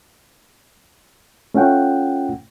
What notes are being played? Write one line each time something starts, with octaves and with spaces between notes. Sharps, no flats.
A3 C#4 F4 F#5 G5